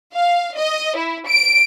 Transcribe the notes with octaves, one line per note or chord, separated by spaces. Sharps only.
F5
D#5
E4
D7